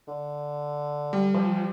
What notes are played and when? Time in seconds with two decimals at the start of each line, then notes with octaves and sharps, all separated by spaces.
0.08 D3
1.13 G3
1.34 F3